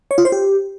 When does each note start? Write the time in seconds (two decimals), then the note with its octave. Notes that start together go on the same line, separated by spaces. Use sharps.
0.11 C#5
0.18 F4
0.25 C5
0.32 G4